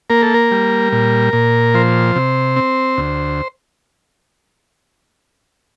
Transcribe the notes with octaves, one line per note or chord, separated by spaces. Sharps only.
A#3 A#4
A4
A#4
G3
A#2
A#2
F3 C5
C3
C4
D2